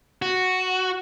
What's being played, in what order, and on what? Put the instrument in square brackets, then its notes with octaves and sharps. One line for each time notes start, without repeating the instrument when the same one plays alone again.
[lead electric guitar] F#4